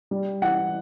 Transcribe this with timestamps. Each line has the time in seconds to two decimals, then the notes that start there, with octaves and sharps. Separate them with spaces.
0.11 G3
0.42 E3 F#5